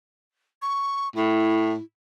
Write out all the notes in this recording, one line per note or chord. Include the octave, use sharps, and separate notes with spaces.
C#6
A2 E4